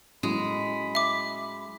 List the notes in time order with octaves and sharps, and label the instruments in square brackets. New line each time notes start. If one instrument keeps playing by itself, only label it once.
[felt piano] A2 F#3 C#4 [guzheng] G#3 [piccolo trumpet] B5
[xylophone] E5 D6